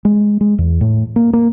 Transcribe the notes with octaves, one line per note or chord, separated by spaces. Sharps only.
G#3
G#3
E2
A2
A#3
A#3